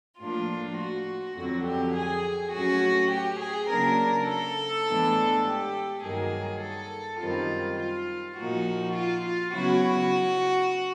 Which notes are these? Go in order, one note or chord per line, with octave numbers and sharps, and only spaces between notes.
A2 F3 A#3 D4 F4
F#4
F2 D3 F#3 F#4
G4
G#4
A2 F#3 A3 C#4 F#4
G4
G#4
C#3 F#3 A#3 D4 A#4
A4
A2 E3 G#3 B3 D4
G4
G2 D#3 F#3 A#3 G#4
A4
F#2 D#3 G3 C4 F4
F4
A#2 F3 A#3 D#4 F#4
F4
F4
C#3 F#3 B3 E4 F#4